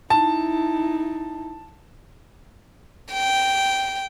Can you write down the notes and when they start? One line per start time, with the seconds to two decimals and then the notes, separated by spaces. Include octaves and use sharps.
0.10 D#4 E4 A5
3.13 G5